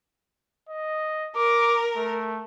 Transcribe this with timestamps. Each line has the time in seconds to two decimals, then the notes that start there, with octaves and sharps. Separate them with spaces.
0.69 D#5
1.36 A#4 D6
1.96 A3